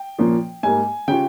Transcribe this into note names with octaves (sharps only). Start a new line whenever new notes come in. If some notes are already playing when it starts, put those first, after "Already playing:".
Already playing: G5
A#2 F3 A#3 C#4
G#2 G3 A#3 G#5
C#3 G3 C#4 F4 G5